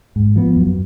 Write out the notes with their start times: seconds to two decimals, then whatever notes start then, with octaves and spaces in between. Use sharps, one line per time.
0.16 G#2
0.36 F3 B3
0.56 F#2